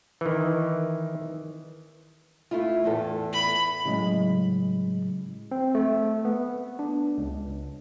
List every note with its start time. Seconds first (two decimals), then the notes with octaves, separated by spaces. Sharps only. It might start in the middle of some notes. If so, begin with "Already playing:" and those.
0.21 D#3 E3
2.51 A3 E4 F4
2.84 E2 A2 A4
3.33 B5
3.85 A2 C#3 F#3 G#3
5.51 C4
5.75 A3
6.25 B3
6.79 D4
7.18 C#2